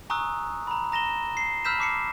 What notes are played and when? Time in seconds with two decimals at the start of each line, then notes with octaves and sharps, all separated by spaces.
0.10 G#5 A#5 C#6 D#6 E6 F#6
0.67 A#5 B5
0.92 A#5 A#6 E7 G7
1.37 C7
1.65 B5 E6 F6 G6 B6 E7
1.78 A5 D6 C7 C#7